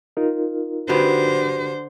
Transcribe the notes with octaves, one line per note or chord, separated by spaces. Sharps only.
D#4 F4 A#4
D3 F#4 G4 B4 C5